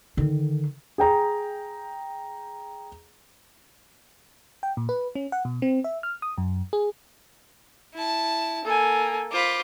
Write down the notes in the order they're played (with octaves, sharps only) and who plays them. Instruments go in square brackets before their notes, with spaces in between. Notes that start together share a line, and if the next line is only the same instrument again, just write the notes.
[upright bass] D3 D#3
[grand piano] G#4 G5 A#5
[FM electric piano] G5
A#2
B4
C#4
F#5
B2
C4
E5
F6
D#6
F#2
G#4
[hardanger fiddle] E4 A5
[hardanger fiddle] A#3 [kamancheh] A4 G#5
[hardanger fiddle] F4 C5 [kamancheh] B5 D6